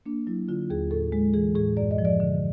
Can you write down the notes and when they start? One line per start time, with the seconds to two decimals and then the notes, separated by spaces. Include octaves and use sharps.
0.06 A#3 D4
0.27 F#3 E4
0.49 D3 F4
0.70 D#2 G#4
0.91 A2 A4
1.12 G#3
1.34 E3 G#4
1.56 A2 G#4
1.77 F#2 D5
1.91 D#5
1.98 F3
2.05 D5
2.20 D3